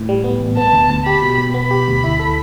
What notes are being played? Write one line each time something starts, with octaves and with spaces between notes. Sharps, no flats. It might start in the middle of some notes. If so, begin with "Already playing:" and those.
Already playing: A2
G3
B3
A1
B3 A5
D2
D2
G4 B5
B2
B2
B3 B5
G4
D2
E4
A4